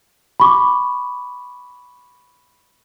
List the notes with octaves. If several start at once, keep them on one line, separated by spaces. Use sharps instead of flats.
B5 C#6 D6